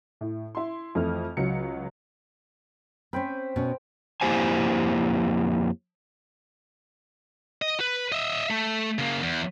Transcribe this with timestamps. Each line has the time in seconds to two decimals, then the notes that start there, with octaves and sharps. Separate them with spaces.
0.21 A2
0.55 E4 C6
0.95 F2 E3 A3 F6
1.37 C#2 F#3 C#7
3.13 C4 C#4 C5 G5 B5
3.56 B2 C#4
4.21 F2 A#3 E4 G4 C5 G#5
7.62 D#5
7.80 B4
8.12 D#5 E5
8.50 A3
8.99 C#3 A#3
9.23 E2